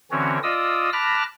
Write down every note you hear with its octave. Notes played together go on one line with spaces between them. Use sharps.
D3 E3 C4 C#4 F#4 C#5
F4 D5 D#5 D#6 E6
A5 B5 D6 F6 F#6 A#6